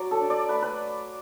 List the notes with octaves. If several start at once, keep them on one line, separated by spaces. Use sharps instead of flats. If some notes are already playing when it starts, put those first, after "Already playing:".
Already playing: F#3 D5
A4
D4
D5
A3 B4
B4